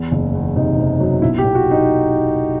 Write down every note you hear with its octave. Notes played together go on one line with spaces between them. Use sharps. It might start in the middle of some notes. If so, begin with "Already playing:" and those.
Already playing: E2
F#1
E2
C3 D#4
C3
F#3
B1 E4
G4
B1
F#4
D#4